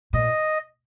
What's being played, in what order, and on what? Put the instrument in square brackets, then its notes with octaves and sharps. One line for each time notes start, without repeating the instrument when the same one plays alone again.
[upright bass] A#2 [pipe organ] D#5